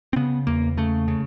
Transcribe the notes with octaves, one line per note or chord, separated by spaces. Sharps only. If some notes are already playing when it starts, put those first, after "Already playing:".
C4
C#3 B3
E2 A#3
C#3 A3
C#3